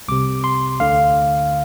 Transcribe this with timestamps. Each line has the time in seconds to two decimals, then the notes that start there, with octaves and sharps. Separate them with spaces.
0.08 C2 C3 D6
0.44 C6
0.80 D2 D3 F5